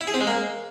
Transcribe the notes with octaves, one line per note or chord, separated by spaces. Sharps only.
E4
G#4
C4
G#3
A#3